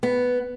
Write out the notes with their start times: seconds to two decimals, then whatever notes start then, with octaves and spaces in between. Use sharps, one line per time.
0.03 B3